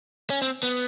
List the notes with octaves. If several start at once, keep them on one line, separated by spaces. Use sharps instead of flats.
C#4
C4
B3